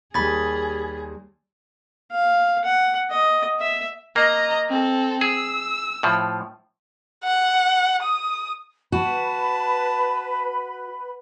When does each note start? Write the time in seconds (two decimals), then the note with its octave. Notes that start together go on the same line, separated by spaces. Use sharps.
0.14 D#2 G3 G#4 B5 G#6 A6
2.12 F5
2.65 F#5
3.11 D#5
3.60 E5
4.16 A#3 D#5 A#5
4.69 C4 A4
5.21 G#4 E6
6.03 A2 F3
7.24 F#5
8.03 D#6
8.92 F#4 B4 A5 B5